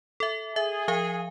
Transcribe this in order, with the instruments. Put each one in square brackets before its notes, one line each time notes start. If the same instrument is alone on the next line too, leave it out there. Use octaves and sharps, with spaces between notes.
[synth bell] A4 E5
[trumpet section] G#4 [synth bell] E5
[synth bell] F3 F5 G#5